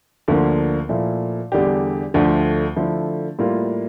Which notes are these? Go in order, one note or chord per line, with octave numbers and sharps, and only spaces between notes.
D2 D3 F3 A#3
A#2 F3 A3 E4
E2 D3 G3 D4 G4
D2 D3 F3 A3
D3 F3 A3 E4
A2 G3 A#3 F4